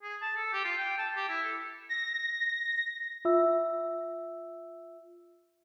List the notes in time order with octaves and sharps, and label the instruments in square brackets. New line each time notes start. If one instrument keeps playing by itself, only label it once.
[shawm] G#4
A5
A4
G4
F4
G5
A5
G4
E4
A4
[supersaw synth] A#6
[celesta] F4 E5 E6